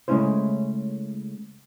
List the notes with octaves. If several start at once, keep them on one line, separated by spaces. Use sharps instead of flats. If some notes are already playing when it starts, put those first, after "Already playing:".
C#3 G#3 A3 C#4 E4 C5